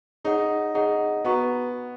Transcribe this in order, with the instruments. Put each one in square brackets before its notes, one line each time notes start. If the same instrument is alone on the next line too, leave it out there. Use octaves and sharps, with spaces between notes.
[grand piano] D#4 [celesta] G#4 C#5 F#5
[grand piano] D#4 [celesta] G#4 C#5 F#5
[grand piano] B3 [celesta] F#4 B4 F#5 A#5 C#6